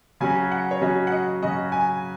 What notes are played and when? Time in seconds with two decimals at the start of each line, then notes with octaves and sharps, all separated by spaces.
0.21 C#3 F#3 C#4 F#4 G#5
0.52 F#5
0.71 C#5
0.81 C#3 F#3 C#4 F#4 D#5
1.07 F#5
1.12 D#5
1.42 C#3 F#3 C#4 F#4 D#5
1.72 G#5